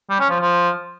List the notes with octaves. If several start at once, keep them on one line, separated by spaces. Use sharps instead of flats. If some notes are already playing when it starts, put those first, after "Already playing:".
G3
C#4
F3
F3